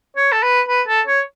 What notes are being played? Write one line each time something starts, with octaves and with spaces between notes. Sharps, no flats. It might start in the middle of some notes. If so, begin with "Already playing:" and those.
C#5
A4
B4
B4
A4
C#5